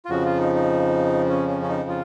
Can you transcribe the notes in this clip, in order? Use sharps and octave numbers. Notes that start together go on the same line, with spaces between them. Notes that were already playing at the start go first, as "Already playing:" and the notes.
F4
F2 C#3 F3 F#4
F4
D#4
D#4
C#4
C#4
C#4
D#4
F4